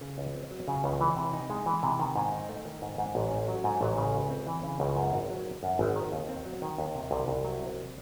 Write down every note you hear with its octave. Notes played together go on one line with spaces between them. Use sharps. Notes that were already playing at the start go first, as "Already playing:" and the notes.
C#3
C#2
C4
F#3
C#3
C#2
E3
C3
D#4
G#3
E3
C3
D#3
G#2
D#4
A3
D#3
G#2
G#2
A1
C#4
F#3
G#2
A1
C#3
C#2
C4
E3
C#3
C#2
F#2
G#1
F#3
D#3
F#2
G#1
D#3
D#2
C4
F#3
D#3
D#2
C3
C2
C2
F#3
C3